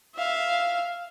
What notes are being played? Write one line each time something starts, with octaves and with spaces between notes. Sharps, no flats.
E5 F5